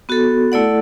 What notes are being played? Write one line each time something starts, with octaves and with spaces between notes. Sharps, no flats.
B3 F#4 A4
A3 E4 A4 D5 F#5